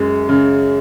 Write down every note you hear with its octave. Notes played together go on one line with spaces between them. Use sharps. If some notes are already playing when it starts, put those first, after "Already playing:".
Already playing: F#2 G#3
C#3